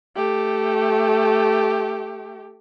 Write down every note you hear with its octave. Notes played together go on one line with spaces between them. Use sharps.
A3 G4